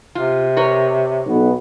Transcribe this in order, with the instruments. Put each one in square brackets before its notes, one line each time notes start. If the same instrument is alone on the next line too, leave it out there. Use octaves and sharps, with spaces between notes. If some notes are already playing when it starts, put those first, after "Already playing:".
[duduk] C3 [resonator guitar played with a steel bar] F4
[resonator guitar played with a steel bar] A#4 B4 C#5
[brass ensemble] B1 B3